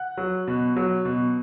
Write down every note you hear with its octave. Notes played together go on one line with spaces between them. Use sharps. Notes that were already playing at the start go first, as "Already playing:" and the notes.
Already playing: F#5 F#6
F#3
B2
F#3
B2